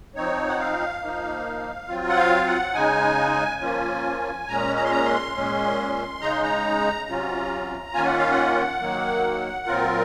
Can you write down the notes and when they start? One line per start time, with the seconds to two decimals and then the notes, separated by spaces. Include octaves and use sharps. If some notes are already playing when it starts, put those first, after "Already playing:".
0.15 F3 C4 D#4 C#5
0.48 F#5
0.59 F5
1.02 F3 A#3 D#4
1.88 F#3 C4 F4
2.09 F#5
2.17 F5
2.47 F#5
2.74 C#3 G#3 D#4 G#5
3.61 F3 A#3 C#4 F4
4.47 A#2 G#3 C#4 A#5
4.76 A#5
4.84 C6
4.91 A#5
5.05 C6
5.34 A#2 G#3 C#4
6.21 C#3 G#3 D#4 A#5
6.31 C6
6.43 A#5
7.07 C3 F#3 C#4 F4
7.93 D#3 A#3 C#4 F4 G#5
8.05 F#5
8.18 F5
8.31 F#5
8.80 D#3 F#3 A#3
9.66 A#2 F#3 C4 F4 A#4